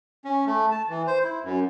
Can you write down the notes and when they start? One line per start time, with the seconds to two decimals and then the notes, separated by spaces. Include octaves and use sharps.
0.25 C#4
0.46 A3
0.71 A5
0.89 E3
1.07 C5
1.24 E4
1.44 F#2